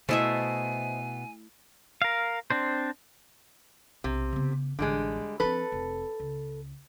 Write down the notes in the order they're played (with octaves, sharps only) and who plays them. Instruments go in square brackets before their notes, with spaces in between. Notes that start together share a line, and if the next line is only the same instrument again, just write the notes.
[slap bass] B2 [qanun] A3 E4 E5 [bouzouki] C5 D#5 [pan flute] G#5
[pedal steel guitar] A#4 F5
C4 D4 C5
[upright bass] B1 [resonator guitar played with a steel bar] C3
[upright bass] C#3 B3
[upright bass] A1 [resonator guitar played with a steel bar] D3 G3 G#3
[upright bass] F3 C4 [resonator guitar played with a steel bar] A4 B4
[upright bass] F1
C#2